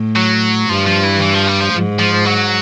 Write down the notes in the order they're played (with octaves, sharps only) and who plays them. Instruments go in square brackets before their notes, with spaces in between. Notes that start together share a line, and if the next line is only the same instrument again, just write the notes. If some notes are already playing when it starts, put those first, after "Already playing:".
Already playing: [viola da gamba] A2
[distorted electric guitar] F#3
[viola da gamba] G2 [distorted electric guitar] F3
[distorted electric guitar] F3
E3
E3
F3
G3
F3
[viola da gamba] G#2
[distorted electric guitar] F3
F#3